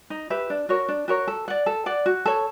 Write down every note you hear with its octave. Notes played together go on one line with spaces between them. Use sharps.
D#4
G4 B4 E5
D4
F#4 A#4 C#5
D4
F#4 A#4 C#5
A4
D5 F#5
A4
D5 F#5
F#4
A4 C#5